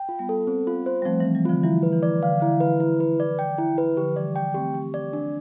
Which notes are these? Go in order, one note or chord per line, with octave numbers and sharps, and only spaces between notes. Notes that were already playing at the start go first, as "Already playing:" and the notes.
Already playing: G5
F4
G3 B3
A4
C4
F4
C5
G3
F3 A3 C4
E3 G3 C4
E3 G3
D3 F3 F4
E3 G3 E4
B4
E3
D5
D3 F5
D3 E4
E3
B4
E4
B4
D5
G5
E4
B4
D3 F3 G4
E3 G3 D5
G5
A3 C4 G4
G4
D5
D4